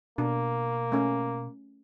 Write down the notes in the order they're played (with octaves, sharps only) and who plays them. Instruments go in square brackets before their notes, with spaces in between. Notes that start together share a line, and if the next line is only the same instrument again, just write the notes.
[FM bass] B2 [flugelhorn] A#3 [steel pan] D4
[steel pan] A3 C#4